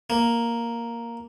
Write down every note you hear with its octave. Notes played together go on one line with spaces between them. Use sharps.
A#3